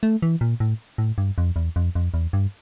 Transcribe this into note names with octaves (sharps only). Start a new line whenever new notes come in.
A3
E3
A#2
A2
A2
G2
F2
E2
F2
F2
E2
G2